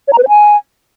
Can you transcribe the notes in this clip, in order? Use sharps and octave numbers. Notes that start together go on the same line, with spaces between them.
C#5
A#5
B4
C5
G#5